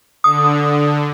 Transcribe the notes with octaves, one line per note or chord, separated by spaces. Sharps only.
D3 D#6